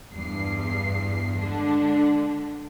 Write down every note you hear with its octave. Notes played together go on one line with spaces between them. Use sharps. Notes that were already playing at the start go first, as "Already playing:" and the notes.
E2 G2 C7
D3 G#3 D4